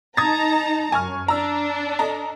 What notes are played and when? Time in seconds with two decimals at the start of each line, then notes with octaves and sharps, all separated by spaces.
0.17 D#4 A5 A#5 D#6 G#6 A6
0.92 F#2 G#5 C#6 F6
1.28 D4 A#5 E6
1.99 A4 D#5 A#5